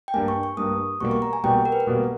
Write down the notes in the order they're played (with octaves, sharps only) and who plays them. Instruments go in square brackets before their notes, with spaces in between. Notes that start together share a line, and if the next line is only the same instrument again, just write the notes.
[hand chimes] G5
[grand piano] G2 G3 A#3 [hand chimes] G#5
[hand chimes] C#6
C#6
[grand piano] G2 G3 A#3 [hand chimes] D#6
[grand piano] B2 G3 A#3 [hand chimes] C#6
[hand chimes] C#6
A#5
G#5
[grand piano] B2 G3 A#3 [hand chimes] G5
[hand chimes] A#4
B4
A#4
[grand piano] B2 G3 A#3